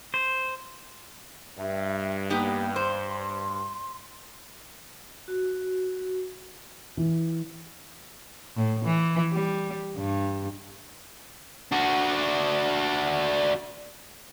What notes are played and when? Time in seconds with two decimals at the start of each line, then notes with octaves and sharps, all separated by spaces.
0.14 C5
1.58 G2 E5
2.30 A#3 B3 D#4 G4
2.76 C5 C6
5.28 F#4
6.97 E3
8.56 A2
8.85 E3
9.32 G3
9.97 G2
11.72 D4 F#4